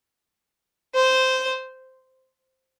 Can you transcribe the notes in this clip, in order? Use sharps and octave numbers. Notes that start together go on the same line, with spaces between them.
C5